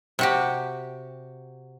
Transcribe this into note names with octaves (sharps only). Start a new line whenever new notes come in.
C3 F#4 G4